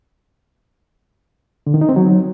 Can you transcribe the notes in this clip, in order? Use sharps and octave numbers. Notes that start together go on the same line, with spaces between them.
D3
D#3
D#4
C4
F#3